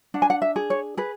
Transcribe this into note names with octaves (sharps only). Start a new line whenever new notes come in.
D4 F#5
G#5
F#5
E5
G#4
C#5
G#4 B4